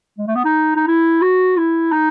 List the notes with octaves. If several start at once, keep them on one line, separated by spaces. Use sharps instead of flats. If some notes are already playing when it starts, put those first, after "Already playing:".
G#3
A3
B3
D#4
D#4
E4
F#4
E4
D#4